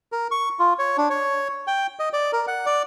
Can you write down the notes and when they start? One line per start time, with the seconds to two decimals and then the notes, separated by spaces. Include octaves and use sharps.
0.12 A#4
0.31 C#6
0.59 F4
0.79 C#5
0.98 D4
1.10 C#5
1.67 G5
1.99 D#5
2.13 D5
2.32 A#4
2.47 F#5
2.66 D5